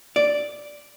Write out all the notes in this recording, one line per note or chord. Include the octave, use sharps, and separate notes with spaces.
D5